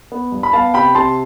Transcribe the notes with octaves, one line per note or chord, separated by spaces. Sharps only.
B3
G2
B5
B3 F5 A5
C3 G5 B5
C3 A5 C6